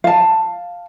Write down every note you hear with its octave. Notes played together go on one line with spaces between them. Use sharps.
F5 A5